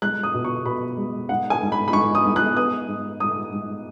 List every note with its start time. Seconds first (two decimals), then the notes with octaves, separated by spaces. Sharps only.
0.02 G#3 F#6
0.23 D#6
0.34 B2
0.45 C#6
0.66 B2 B5
0.98 G#3
1.29 G#2 F#5
1.50 G#5
1.62 G#2
1.72 B5
1.88 B5
1.93 G#2 C#6
2.15 D#6
2.25 G#2
2.36 F#6
2.57 B3 D#6
2.88 G#2
3.20 G#2 D#6
3.52 G#2